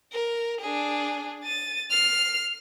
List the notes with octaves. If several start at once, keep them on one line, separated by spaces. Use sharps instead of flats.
A#4
D4 G#4
A6 D#7
F6 C7